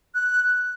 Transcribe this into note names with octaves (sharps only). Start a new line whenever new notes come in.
F#6